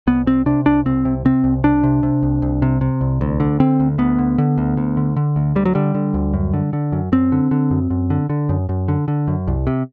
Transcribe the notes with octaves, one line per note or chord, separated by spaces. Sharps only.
C2 B3
C3 C4
C3 D4
C2 D4
C2 C4
C3
C3 C4
C2
C2 D4
C3
C3
C2
C2
C3
C3
C2
D2
D3
D3 C4
D2
D2 B3
D3
D3
D2
D2
D3
D3
D2
D2 G3
F#3
D3 G3
D3
D2
F#2
D3
D3
F#2
F#2 C4
D3
D3
F#2
F#2
D3
D3
F#2
F#2
D3
D3
F#2
C2
C3